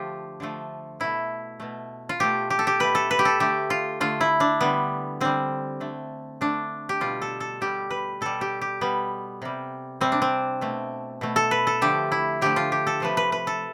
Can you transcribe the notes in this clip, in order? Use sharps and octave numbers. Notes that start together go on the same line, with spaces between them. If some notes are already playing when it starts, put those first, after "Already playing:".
Already playing: D3 F3 A3 F4 G4
D3 F3 A3
B2 A3 E4
B2 A3
F4
B2 A3 G4
G4
A4
G4
B2 A3 B4
A4
B4
G4
A4
D3 A3 G4
F4
D3 A3 F4
E4
D4
D3 G3 B3
D3 G3 C4
D3 A3
D3 A3 D4
G4
B2 G3 F4
A4
A4
B2 G3 G4
B4
B2 G3 A4
G4
G4
B2 G3 B3
C3 G3
C3 G3 C4
D4
C4
B2 A3
B2 A3
A4
B4
A4
D3 F3 A3 G4
E4
D3 F3 A3 G4
F4
G4
A4
C3 F3 A3 B4
B4
B4
A4